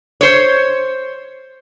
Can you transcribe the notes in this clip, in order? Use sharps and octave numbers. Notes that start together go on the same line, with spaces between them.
C5 C#5